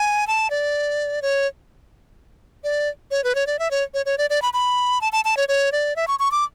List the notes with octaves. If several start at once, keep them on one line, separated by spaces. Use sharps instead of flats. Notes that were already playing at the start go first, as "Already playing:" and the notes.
Already playing: G#5
A5
D5
C#5
D5
C#5
B4
C#5
D5
E5
C#5
C#5
C#5
D5
D5
B5
B5
A5
A5
A5
C#5
C#5
D5
E5
C#6
C#6
D6